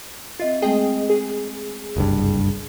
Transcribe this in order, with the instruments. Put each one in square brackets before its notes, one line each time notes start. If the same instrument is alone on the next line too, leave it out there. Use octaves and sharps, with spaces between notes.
[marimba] C4 D#5 E5 [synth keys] F4
[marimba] G#3 A3 C4 [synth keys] G#4 D#5 G5
[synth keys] G#4
[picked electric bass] F#1 C2 G2